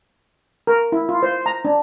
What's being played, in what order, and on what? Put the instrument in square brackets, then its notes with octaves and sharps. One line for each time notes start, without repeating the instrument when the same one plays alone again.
[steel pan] A#4
E4
F4
C5
A#5
D4